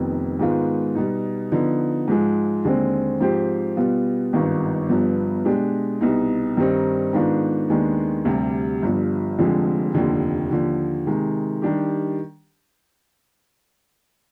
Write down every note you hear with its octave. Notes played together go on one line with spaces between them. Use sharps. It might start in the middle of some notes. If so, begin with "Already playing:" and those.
Already playing: F1 F2 D#3 B3
G#2 D#3 G#3 B3 F4
B2 G3 B3 D#4
D3 F3 B3 D#4
G#2 F3 G#3
D#2 D3 G#3 C4
G#2 F3 C4 G4 C5
B2 G3 B3 F4
G#1 G2 D#3 B3 F4
G1 G2 F3 B3
B2 G#3 D4 G4
C2 B2 B3 D#4
G2 D#3 G3 C4 D#4
G#2 D#3 B3 D4 F4
D#2 D#3 G#3 B3 D4
D2 C3 G3
G1 G2 F3
F1 F2 D3 F3 G#3
F1 D#2 D3 F3
D#2 D3 F3
C3 D#3 G#3
D#3 G3 D4 G4